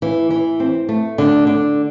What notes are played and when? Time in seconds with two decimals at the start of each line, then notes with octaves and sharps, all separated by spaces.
0.02 E3
0.31 E3
0.60 C4
0.89 A3
1.18 D3
1.47 D3